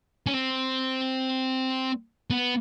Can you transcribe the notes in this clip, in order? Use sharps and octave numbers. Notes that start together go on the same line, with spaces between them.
C#4
C4
B3